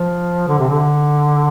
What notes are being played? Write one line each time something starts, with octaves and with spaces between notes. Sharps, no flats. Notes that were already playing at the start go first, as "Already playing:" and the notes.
Already playing: F3
D3
C3
D3